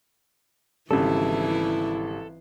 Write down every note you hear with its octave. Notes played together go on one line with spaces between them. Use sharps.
G#1 C#3 E3 G3 E4 A4